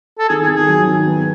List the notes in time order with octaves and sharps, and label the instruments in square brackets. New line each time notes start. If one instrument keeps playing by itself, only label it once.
[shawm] A4
[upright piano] D#3 [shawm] G#4
[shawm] G#4
[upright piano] D#3
[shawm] G#4
[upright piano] F#3
D#3
B3